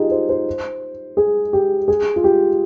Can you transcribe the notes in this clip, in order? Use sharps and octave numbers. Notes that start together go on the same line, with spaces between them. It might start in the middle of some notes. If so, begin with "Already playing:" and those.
Already playing: D#4 F4 G4 G#4
C5
C5
G#4
G4
G#4
F4
G4